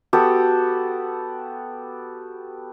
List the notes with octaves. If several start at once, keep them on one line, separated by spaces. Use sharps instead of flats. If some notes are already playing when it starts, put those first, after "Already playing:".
B3 F#4 G4 A4